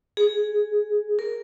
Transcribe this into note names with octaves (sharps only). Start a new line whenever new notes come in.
G#4
A#4